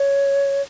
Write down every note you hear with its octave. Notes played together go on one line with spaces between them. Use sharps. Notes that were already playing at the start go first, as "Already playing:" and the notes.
Already playing: C#5